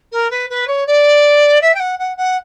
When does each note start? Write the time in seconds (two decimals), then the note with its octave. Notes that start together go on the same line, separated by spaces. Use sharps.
0.12 A#4
0.30 B4
0.49 B4
0.67 C#5
0.86 D5
1.61 E5
1.74 G5
1.79 F#5
1.99 F#5
2.17 F#5